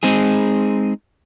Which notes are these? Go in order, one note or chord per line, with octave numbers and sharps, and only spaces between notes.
G#3 C4 D#4 G#4